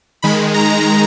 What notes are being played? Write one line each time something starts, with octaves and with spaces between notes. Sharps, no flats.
D#3 G#3 B5
A#5